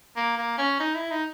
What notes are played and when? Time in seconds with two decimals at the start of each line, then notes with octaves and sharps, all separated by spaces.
0.16 A#3
0.38 A#3
0.58 C#4
0.80 D#4
0.95 E4
1.11 D#4